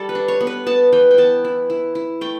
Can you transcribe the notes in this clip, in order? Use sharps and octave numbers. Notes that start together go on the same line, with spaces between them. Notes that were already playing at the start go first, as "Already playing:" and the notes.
Already playing: G3 A4
B4
D4
C#5
B3
B4
B3 A5
E3 G5
G5
B3 A5
E4
E4
E4
A3 G5